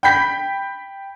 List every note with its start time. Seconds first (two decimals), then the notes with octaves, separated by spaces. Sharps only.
0.03 G5 B5 G6 B6